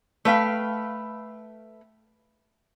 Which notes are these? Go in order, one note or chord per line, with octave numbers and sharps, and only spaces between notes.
A3 B4 F5 G5